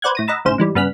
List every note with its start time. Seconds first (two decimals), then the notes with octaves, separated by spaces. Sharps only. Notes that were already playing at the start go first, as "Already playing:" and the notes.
0.02 B4 C5 D5 F#5 F#6 G#6
0.15 A2 A#6 D#7
0.27 D#5 F#5 A#5 B5 E6 A6
0.45 G#1 A2 C#3 C5 E7
0.58 G#2 E3 G3
0.75 G2 C#3 B3 F6 F#6 B6